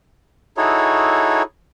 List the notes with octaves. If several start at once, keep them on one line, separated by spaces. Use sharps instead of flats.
D#4 E4 F#4 G#4 A4 C#5